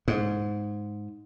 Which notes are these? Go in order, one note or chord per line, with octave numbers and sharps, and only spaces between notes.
G#2